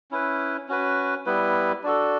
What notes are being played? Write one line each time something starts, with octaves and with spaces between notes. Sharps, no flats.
C#4 E4 B4
C#4 F#4 B4
G3 B3 E4 B4
D4 F#4 A4